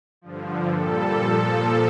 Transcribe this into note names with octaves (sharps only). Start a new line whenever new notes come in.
G2 D3 F3
A#2 G3 A4
A#2 F3